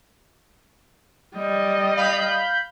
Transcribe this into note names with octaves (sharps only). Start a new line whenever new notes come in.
G3 D#5
F5 B5 G6